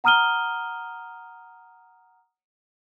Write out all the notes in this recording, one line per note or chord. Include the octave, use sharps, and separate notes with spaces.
F#5 A#5 D#6 F6 D#7 G7